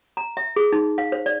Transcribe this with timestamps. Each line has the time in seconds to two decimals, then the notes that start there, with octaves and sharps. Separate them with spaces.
0.17 A#5
0.37 E5
0.56 G#4
0.73 D#4
0.98 F5
1.12 C5
1.26 D5